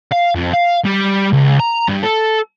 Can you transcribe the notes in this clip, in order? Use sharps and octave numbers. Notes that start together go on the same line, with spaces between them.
F5
F2
F5
G3
C#2
A#5
G2
A4